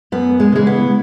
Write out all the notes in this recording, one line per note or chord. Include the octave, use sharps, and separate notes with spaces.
F#2 B3
G#3
C#3 E3 G#3
B3